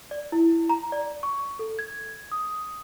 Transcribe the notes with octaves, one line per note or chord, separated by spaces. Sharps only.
D5
E4
A#5
D5
C#6
A4
G#6
D#6